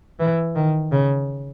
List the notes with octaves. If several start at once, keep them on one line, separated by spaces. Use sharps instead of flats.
E3
D#3
C#3